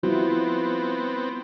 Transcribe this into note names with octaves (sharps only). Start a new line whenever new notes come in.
F3 G3 B3 C4 E4 F#4